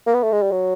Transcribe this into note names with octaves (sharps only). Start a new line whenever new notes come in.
A#3
B3
A3
G#3
G3
F#3